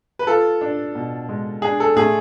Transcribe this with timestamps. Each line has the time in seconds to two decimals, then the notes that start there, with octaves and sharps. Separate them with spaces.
0.19 B4
0.27 F4 A4
0.61 D4
0.95 B2
1.29 G#3
1.62 D4 G#4
1.80 A4
1.96 A3 G#4